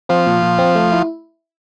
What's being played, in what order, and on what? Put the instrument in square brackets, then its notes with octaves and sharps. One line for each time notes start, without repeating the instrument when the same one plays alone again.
[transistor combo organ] F3 [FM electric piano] C4
[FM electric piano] A#2
A#2
C4
A3
E4